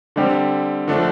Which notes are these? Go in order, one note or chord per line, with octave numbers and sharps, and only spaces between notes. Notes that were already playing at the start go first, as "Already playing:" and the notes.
D3 G3 C4 G4
D3 F3 A3 D4